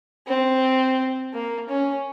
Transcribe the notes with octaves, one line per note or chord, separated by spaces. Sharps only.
C4
A#3
C#4